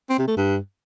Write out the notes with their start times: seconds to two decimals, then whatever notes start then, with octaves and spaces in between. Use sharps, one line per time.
0.09 C4
0.18 C3
0.28 A3
0.37 G2